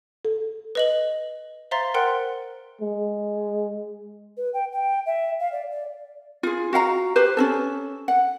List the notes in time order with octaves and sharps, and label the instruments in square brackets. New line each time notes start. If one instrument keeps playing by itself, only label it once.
[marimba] A4
[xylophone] B4 D#5 F#7
C5 E5 F5 A#5 C6 A6
A#4 C5 F#5 G5 C6 F#6
[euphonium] G#3
[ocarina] B4
G5
G5
E5
F5
D5
D5
[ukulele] F4 G#4
F#4 F5 F#5 A#5
G4 B4 C5
C#4 D#4 A4
F#5